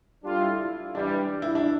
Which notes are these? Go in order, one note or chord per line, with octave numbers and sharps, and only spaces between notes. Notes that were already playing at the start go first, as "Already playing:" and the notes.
G3 D4 F4 A4
E4
G2 E3 G3 D4
E4
D4